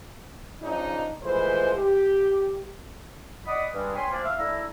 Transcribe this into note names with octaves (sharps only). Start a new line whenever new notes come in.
C#3 F3 D4 D#4
E3 F3 G#3 A3 B4 C5
G4
D5 D#5 F#5 B5 D#6
G2 G3 G#3
C#5 G5 G#5 B5 C6
F3 A#3 D4
E5 F5
A3 D4 E4 A#5 E6